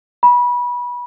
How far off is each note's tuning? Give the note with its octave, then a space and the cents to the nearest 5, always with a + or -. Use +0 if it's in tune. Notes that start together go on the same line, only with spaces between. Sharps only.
B5 -25